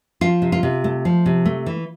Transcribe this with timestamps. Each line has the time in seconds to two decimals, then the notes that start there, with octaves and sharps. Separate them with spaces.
0.21 F3 F4
0.42 C3
0.52 F4
0.63 C3
0.84 A3
1.05 F3
1.26 C3
1.46 A3
1.66 E3